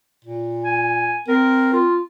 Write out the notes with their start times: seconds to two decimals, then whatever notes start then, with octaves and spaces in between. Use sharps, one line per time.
0.25 A#2
0.64 G#5
1.28 C4 A#4
1.73 F4